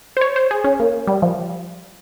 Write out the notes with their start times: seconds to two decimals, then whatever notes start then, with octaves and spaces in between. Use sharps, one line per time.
0.17 C5
0.21 C#5
0.36 C5
0.51 G#4
0.64 C#4
0.80 A#3
1.07 G3
1.22 F3